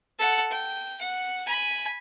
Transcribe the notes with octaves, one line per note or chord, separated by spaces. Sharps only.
A4 F#5
G5
F#5
G#5 B5